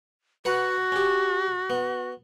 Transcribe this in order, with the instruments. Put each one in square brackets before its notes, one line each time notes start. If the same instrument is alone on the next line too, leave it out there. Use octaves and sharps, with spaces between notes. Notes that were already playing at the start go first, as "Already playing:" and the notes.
[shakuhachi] F#4 [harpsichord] B4 F#5 A#5
[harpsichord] C#4 G4
B3